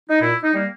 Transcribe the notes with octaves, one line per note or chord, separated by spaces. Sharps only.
D#4
A#2 E4
D#4
G3 A#3